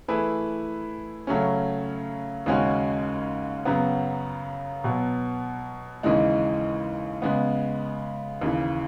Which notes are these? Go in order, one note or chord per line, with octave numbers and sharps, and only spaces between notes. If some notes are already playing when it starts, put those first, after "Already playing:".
E3 A3 E4 G#4 B4
C#3 F#3 A3 C#4
D#2 C#3 G#3 C#4 F#4
F#2 C#3 F#3 B3
B2 F#3 B3
D#2 C#3 E3 G#3 D#4
C#3 G#3 B3
D#2 C#3 E3